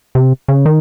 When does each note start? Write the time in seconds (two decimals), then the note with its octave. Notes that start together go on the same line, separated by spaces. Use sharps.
0.15 C3
0.48 C#3
0.66 D#3